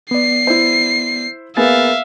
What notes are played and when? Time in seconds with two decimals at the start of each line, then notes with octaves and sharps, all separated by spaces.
0.11 B3 D5 C7
0.47 E4 C5
1.57 A#3 B3 G#4 E5 F5 A6